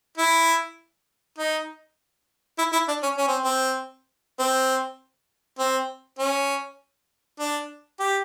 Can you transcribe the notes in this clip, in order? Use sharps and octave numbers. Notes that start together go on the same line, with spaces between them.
E4
D#4
E4
E4
D4
C#4
C#4
C4
C4
C4
C4
C#4
D4
G4